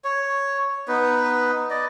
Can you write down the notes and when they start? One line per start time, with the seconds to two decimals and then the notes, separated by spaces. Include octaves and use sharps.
0.04 C#5
0.88 B3 D#4 B4
1.70 D5 D#5